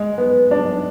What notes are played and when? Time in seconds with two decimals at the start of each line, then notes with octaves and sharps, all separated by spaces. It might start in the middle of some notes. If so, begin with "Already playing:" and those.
Already playing: G#3
0.18 B3
0.51 D4